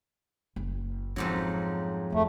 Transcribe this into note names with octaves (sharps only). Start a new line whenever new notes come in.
F#1
F2 G#2 F#3 C#4
F2 A3